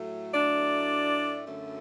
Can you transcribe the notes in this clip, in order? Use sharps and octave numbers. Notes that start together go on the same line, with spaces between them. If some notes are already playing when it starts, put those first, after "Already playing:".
Already playing: A2 F#3 A3
D4 D5
F#2 D3 F#3 A3